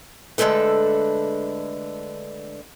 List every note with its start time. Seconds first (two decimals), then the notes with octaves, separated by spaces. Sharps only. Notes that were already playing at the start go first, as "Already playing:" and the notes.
0.38 D3 G#3 A3 A4 B4